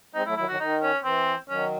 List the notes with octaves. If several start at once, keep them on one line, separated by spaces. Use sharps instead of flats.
G#3 C4 D#4
F#3 A3 E4
D#3 F#3 E4
D#3 F#3 F#4
D#3 D#4
C#4
E3 C4
D#3 F#3 C#4